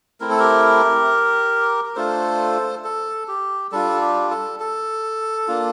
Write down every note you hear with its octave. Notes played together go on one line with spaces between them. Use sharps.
A3 C4 E4 A#4
A4
G4 A#4
A#4
A3 D4 F4 A4 C5
A4
G4
G3 D4 F4 A4
G4
A4
A4
A#3 D4 F4